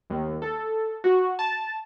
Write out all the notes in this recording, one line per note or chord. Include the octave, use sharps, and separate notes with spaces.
D#2
A4
F#4
A5